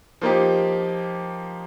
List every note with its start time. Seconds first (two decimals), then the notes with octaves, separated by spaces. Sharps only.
0.21 F3 A#3 D#4 G4